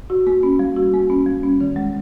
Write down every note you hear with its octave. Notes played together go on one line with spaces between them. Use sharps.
F#4
A#3
C#4
G3
F#4
A#3
C#4
G3
C#4
D#3
G#3